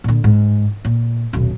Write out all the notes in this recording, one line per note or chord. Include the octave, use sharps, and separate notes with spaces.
A#2 D3
G#2
A#2
D#1 B1